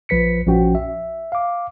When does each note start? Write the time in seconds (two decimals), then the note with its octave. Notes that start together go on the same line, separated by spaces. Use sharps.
0.09 A#1 F3 B4 B6 C#7
0.46 A#1 F3 C#4 F#4 G5
0.75 E5
1.32 F5 D6